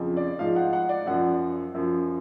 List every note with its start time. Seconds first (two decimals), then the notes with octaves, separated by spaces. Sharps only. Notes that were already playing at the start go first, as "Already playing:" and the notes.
Already playing: F2 C#3 F3
0.16 D5
0.39 G#2 F3 F5
0.56 F#5
0.73 F#5
0.89 D5
1.06 F#2 F3 F#5
1.74 F#2 F3